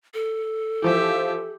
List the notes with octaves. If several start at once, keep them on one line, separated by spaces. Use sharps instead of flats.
A4
E3 F3 F4 G4 E5